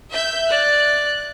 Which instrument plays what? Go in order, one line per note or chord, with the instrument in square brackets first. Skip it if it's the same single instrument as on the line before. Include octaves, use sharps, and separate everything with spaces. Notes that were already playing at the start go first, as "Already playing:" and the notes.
[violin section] E5 G6
[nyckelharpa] D5 [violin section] F#6